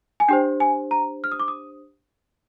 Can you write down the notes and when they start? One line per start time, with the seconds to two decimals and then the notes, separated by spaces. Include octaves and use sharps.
0.20 G#5
0.28 D4 G4 C5 G5
0.60 G#5
0.91 A#5
1.24 F6
1.32 D#6
1.39 D6
1.48 D#6